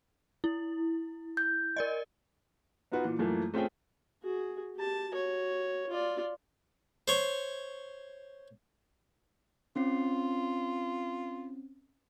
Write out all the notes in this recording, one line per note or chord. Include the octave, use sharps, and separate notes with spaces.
E4
G6
A#4 D5 D#5
B3 D#4 F4 F#4 B4
A#2 E3
F#2 E3 F3 A3 A#3
A3 C4 C#4 F4 G#4 G5
F#4 G#4
G4 A5
F#4 C#5
F4 D5
C5 C#5
C4 C#4 F4 C7